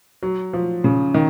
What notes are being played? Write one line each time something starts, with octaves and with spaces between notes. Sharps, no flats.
F#3
F3
C#3
D#3